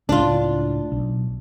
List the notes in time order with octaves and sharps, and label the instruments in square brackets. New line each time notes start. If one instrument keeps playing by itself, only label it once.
[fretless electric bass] C#2 A2 [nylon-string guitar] D4 F4
[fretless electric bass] B1